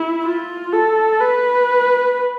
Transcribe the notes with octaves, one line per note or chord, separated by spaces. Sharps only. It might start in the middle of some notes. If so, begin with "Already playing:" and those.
Already playing: E4
F4
A4
B4